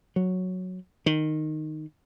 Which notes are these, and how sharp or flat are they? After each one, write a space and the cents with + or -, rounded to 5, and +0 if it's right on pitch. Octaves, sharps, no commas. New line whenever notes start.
F#3 -5
D#3 -10